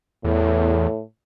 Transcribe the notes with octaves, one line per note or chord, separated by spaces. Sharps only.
E2 A2